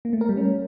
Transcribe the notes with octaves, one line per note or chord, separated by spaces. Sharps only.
A#3
A3
A#4
G3
C#4